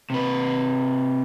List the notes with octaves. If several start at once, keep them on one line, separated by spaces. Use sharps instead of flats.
C3 B4